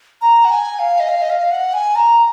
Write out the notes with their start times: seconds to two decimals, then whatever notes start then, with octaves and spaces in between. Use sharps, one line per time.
0.22 A#5
0.45 F#5
0.51 G#5
0.79 F5
1.00 D#5
1.09 F5
1.22 D#5
1.30 F5
1.51 F#5
1.74 G#5
1.96 A#5